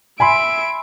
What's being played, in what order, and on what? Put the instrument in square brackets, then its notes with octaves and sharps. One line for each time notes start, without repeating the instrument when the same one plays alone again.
[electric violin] E5 D7 [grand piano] G#5 B5 C6